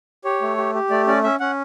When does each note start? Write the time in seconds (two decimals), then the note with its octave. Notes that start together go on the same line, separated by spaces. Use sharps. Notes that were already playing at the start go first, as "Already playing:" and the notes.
0.24 G4 C#5
0.42 A3
0.57 G4
0.74 G4
0.90 A3 D5
1.07 C#4 D5
1.24 C#4 E5
1.40 C#4 F#5